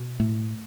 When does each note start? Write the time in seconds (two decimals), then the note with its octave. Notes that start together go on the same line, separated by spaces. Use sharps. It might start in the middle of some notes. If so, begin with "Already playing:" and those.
Already playing: B2
0.20 A2 A3